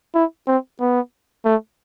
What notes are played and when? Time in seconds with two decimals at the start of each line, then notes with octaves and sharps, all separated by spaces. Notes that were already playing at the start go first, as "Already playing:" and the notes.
0.14 E4
0.47 C4
0.80 B3
1.45 A3